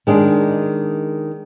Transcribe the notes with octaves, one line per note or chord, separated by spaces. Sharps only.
D#3 G#3 D4